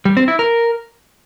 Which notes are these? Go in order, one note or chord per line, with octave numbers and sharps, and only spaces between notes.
G3
C4
E4
A#4